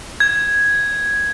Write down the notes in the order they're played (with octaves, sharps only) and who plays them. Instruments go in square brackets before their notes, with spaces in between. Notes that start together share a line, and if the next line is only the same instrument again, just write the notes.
[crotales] G#6